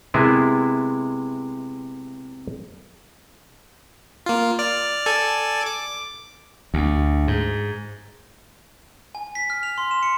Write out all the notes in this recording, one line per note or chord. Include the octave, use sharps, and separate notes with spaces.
C3 G#3 B3 E4 G#4 A#4
A#3 F4
D5 F6
A4 D5 G#5
D6
D2
G#2
G#5
B6
F6
F7
C6
E7
C#7